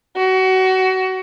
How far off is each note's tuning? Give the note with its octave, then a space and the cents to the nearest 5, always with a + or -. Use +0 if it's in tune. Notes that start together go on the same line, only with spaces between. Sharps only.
F#4 +25